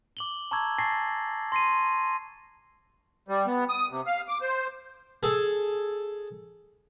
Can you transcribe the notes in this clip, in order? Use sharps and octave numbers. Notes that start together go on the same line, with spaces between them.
D6 F#7 G7
A5 A#5 C#6 D6 E6 G#6
G#5 A5 C#6 A6 A#6 C7
C6 A#6 C7 D#7
G3
B3
D#6
C3
F5
D6
C5
G#4 A4